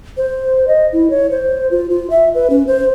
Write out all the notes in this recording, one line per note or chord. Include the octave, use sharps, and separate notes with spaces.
C5
D#5
E4
C#5
C5
F4
F4
E5
B4
C#4
C5